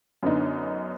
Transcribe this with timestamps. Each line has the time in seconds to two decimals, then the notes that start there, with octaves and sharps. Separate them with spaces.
0.23 F#2 D3 B3 D4 D#4